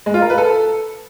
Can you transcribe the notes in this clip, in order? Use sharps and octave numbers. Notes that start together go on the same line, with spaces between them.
G#3
F4
A#4
B4
A4